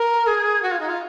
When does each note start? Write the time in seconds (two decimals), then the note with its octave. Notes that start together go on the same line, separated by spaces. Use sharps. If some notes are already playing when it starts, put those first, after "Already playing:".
Already playing: A#4
0.27 G#4
0.62 F#4
0.71 F4
0.80 D#4
0.89 F4